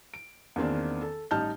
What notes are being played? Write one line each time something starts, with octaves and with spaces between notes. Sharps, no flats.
D7
E2 D#3 A#3 C4 D4
A4
A1 G3 D#4 A5 F6 G6